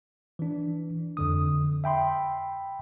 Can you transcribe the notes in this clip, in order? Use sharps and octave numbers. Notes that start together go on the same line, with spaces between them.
E3 D4
F2 D3 D#6
E5 G5 B5 C6